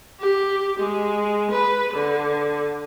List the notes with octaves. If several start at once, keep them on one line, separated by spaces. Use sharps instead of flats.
G4
G#3
B4
D3